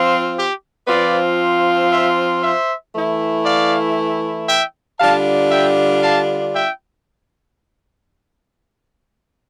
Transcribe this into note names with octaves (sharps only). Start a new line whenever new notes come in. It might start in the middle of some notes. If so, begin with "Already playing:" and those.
Already playing: F3 C4 F4
G4
F3 C4 F4 B4 D5
C5 E5
C5 E5
E3 A3 E4
D5 F5
E5 G5
D3 G3 D4 F4 F5 A5
E5 G5
F5 A5
E5 G5